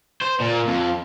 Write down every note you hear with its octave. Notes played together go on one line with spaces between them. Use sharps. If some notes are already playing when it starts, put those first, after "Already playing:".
C5
A#2
F2